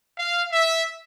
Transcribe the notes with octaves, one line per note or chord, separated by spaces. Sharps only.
F5
E5